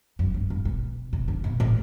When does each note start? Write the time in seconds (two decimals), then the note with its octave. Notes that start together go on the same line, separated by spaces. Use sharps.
0.19 F#2
0.34 G2
0.50 G2
0.65 B2
1.13 C3
1.28 D3
1.44 B2
1.60 A2